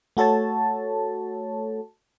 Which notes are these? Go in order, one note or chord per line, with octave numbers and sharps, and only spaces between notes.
A3 F#4 A4 C#5 A5